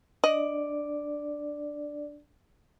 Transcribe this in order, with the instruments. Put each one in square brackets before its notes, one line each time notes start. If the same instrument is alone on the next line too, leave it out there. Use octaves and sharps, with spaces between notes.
[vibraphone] D4 D5 [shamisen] D#5